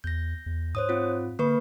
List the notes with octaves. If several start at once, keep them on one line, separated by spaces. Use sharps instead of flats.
E2 G6 A#6
E2
G#2 C5 C#5 D#6
C4 F4
D3 A#3 B4 C#6